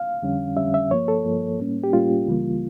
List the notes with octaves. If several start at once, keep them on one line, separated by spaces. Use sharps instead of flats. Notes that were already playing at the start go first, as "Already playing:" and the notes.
Already playing: F5
F2 D3 G3 C#4
F2 D3 G3 C#4 E5
E5
G2 F3 A#3 C#5
A4
G2 F3 A#3
A2 G3 A#3 C#4
G4
A2 G3 A#3 C#4 F4
C#2 C#3 E3 G3 A#3